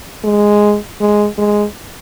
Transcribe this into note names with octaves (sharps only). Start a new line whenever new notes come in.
G#3
G#3
G#3